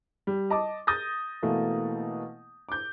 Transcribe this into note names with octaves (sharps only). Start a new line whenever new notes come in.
G3
D#5 A5 D6
D#6 G6 A6 A#6
B2 E3 A3 A#3
D6 G6